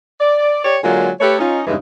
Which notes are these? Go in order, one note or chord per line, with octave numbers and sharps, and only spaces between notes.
D5
G4 C#5 D5
D3 F#3 G#3 A#3 F4 G#4
A3 G4 A4 B4 C#5
C#4 D#4 F4
E2 G2 C#3 E3 G#3 D#4